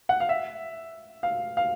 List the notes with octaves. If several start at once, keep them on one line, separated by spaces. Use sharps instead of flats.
F#5
F5
E5
F5
F5